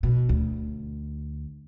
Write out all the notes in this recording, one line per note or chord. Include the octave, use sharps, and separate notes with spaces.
B2
D2